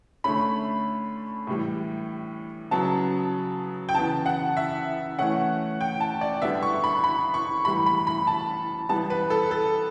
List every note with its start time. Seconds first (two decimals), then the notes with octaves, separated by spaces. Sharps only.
0.24 D3 A3 C#4 B5
1.47 A2 E3 G3
2.71 C#3 F#3 B3 A5
3.89 G5
3.95 C#3 E3 B3 A5
4.26 F#5
4.57 E5
5.19 E3 A3 C#4 F#5
5.81 G5
6.00 A5
6.21 D5
6.42 D3 G3 B3 E5
6.63 C#6
6.84 B5
7.04 B5
7.34 C#6
7.65 A2 E3 G3 B5
7.86 B5
8.07 B5
8.27 A5
8.89 E3 G3 B3 A5
9.10 B4
9.30 A4
9.51 A4